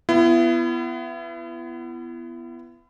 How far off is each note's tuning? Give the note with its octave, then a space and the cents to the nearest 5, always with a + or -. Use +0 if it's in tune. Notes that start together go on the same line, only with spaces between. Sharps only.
B3 +10 E4 +35